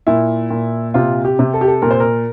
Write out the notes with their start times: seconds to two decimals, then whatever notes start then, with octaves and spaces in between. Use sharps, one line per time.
0.07 A#2 E4
0.50 A#2
0.94 C3 F4
1.25 G4
1.39 C3
1.54 A4
1.61 G4
1.67 A4
1.82 A#2 A#4
1.91 C5
2.00 A#4